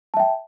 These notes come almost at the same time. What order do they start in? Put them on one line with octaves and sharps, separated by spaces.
A5 E5 G5